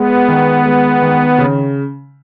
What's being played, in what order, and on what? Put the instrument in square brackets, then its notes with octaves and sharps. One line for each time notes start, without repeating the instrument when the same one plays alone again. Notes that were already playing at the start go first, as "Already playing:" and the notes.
Already playing: [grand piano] G#3 [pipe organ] B3
[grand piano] D#3
G#3
D#3
C#3